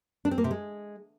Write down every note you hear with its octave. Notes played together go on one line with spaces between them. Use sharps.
D4
C4
A#3
C3
G#3